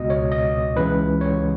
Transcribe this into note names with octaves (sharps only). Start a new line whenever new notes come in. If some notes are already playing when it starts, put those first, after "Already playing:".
Already playing: C#2 B2 D#5
C#5
D#5
C#2 C#3 E3 B4
C#5